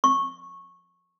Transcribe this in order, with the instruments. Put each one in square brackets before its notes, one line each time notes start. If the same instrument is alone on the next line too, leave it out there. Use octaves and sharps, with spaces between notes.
[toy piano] C#6